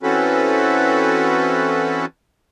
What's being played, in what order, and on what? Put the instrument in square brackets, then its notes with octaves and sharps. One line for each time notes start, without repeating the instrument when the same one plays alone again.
[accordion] E3 C4 C#4 F#4 A4 B4